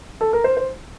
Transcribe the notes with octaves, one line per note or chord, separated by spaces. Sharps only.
A4
A#4
C5
C5